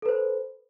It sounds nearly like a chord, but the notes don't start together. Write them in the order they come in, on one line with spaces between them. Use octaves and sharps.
A4 B4 C5